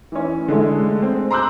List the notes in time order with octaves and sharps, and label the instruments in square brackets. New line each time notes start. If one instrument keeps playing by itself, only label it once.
[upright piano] E3 C#4
D3 G#3 A3
C4
A#5 C6 D6 E6 F#6 G6